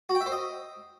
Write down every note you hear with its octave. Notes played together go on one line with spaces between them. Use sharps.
F#4
G5
E5
C5
D#5